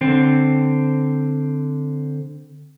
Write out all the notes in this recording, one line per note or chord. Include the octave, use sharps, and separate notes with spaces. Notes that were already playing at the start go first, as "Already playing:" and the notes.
D3 C4